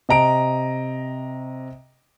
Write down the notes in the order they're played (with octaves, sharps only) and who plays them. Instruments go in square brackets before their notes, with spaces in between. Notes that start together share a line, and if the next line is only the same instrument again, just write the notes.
[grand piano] C3 D#5 A#5 D7